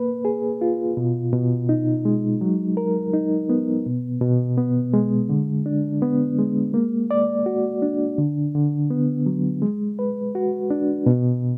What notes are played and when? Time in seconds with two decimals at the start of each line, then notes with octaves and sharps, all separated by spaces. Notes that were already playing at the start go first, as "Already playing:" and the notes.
Already playing: A#3 B4
0.25 G#4
0.61 F4
0.97 B2
1.33 B2
1.69 D#4
2.05 G#3
2.41 F#3
2.77 A#4
3.13 D#4
3.49 B3
3.86 B2
4.21 B2
4.57 B3
4.94 G#3
5.29 D3
5.66 D4
6.02 B3
6.38 G#3
6.74 A#3
7.11 D5
7.46 F#4
7.82 D4
8.18 D3
8.55 D3
8.90 B3
9.26 F#3
9.62 G#3
9.99 B4
10.35 F#4
10.70 D4
11.06 B2